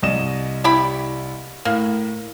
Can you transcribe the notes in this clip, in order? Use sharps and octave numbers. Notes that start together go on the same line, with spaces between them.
C2 D#5 E7
E4 G4 B5
A2 A#3